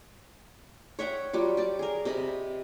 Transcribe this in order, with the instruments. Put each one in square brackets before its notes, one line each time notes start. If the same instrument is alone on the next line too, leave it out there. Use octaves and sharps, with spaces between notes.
[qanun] C#5 E5 F#5 G5
F#3 G3 F4
G4 D5
G#4 A#4
C3 D#5 B5